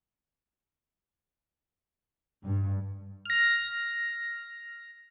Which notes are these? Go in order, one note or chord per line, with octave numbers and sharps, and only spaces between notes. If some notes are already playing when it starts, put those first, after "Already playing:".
G2
F6 A#6